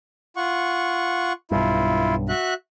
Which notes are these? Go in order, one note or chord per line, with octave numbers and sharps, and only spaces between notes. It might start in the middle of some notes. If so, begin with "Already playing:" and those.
F4 F#5 C#6
B1 G2 E4 F4
F#4 E5 F#6